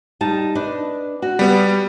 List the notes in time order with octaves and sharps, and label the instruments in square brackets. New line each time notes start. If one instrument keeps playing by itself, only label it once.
[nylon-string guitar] G3 D#4 A5
D4 B4 D#5
F#4
[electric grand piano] G3 B3